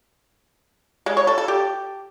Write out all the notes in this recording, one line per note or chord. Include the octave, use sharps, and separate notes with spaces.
G#3
C#5
A4
A4
G4